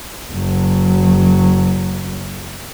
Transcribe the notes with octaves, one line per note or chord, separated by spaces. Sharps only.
F#1 F#3